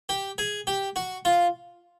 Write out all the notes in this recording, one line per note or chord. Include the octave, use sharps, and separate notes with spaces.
G4
G#4
G4
F#4
F4